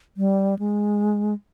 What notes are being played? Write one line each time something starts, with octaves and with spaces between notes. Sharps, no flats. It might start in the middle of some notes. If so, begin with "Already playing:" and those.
G3
G#3